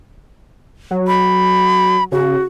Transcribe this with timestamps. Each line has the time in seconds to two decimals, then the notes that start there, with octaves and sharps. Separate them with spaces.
0.91 F#3
1.07 B5
2.12 C#3 F#4